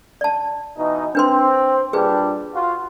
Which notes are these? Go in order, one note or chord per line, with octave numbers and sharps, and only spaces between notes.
D5 A5
B2 E3 D#4
C4 D4 B4 C6
A#2 G3 D4 G#4 B4
F4 F#4